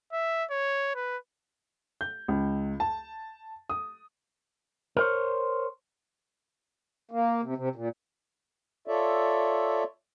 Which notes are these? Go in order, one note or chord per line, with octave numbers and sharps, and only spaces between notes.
E5
C#5
B4
G6
C#2
A5
D#6
A#4 C5 C#5
A#3
C3
C3
A#2
F4 A4 C#5 D5 E5